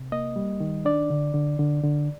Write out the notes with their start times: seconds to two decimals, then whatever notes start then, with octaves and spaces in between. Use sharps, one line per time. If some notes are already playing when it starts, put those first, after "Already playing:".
Already playing: C3
0.12 A#3 D#5
0.36 G3
0.60 D#3
0.85 D4 D5
1.10 D3
1.34 D3
1.59 D3
1.83 D3